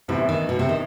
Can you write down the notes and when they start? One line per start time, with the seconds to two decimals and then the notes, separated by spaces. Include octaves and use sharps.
0.08 A1 A2 C3 E3 B3 E4
0.29 D#3
0.49 B2
0.59 C3
0.69 D#3